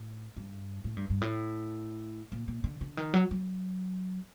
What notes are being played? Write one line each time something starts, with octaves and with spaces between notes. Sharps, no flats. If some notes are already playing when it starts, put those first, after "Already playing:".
Already playing: A2
G2
A2
G2
G2
A2
A#2
A#2
D3
D3
D#3
F#3
F#3